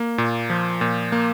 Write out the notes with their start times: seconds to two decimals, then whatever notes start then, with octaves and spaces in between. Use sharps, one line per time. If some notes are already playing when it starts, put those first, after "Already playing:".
Already playing: A#3
0.18 A#2
0.50 F3
0.81 A#2
1.12 A#3